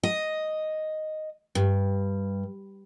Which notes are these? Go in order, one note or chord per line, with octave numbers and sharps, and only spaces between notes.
D#5
G2